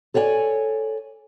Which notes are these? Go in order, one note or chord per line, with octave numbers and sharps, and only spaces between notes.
A4 C#5 D5 F#5 G#5